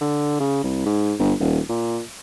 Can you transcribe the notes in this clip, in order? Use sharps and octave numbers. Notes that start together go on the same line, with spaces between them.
D3
C#3
C2
G#2
G1
D#1
A#2